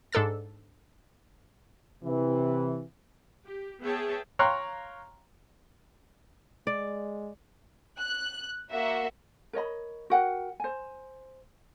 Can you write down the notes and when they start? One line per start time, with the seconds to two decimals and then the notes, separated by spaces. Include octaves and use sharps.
0.12 G#2 D4 A4 E6 A6
2.04 C3 E3
3.46 G4
3.82 B3 G#4 C#5 E5 G5 A5
4.39 C#5 F5 G5 A#5 C6 F#6
6.67 G#3 D5
7.99 F#6
8.71 A#3 F#4 E5
9.53 A#4 C#5 D#5 B5
10.10 F#4 A#4 F#5 G5
10.60 C5 G#5